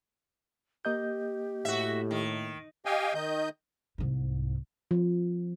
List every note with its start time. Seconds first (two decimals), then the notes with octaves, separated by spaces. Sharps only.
0.85 A#3 G4 D#5 G6
1.65 A2 F#4 E5
2.11 D#3
2.86 G4 D#5 F5 G5 G#5
3.14 D#3 D#5 G6
3.98 C2 G#2
4.91 F3